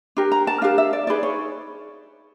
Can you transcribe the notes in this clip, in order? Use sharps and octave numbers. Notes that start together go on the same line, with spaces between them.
D4 G4 A#4
A#5
A5
D4 G4 A#4 F5
E5
D5
D#4 G#4 B4 D5
C#5